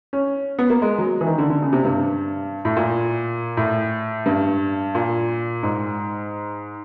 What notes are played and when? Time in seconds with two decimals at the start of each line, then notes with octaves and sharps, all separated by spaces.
0.13 C#4
0.59 B3
0.70 A#3
0.82 G#3
0.99 F#3
1.21 E3
1.27 D#3
1.38 D3
1.50 D3
1.62 C#3
1.73 C3
1.85 G2
2.65 A2
2.77 A#2
3.57 A2
4.26 G2
4.95 A#2
5.63 G#2